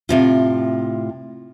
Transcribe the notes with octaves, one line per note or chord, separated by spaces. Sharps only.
A2 C3 F4